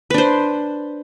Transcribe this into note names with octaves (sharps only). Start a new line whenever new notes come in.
D4 B4 C5